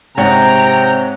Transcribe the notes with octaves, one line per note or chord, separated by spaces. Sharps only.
G#2 C3 C#5 F#5 G5 A#5